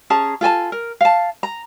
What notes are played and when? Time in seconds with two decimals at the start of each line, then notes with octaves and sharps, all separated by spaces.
0.10 C#4 G#4 A5 A#5
0.41 F4 A4 G#5 A5
0.72 A#4
1.01 F5 A5
1.43 A#5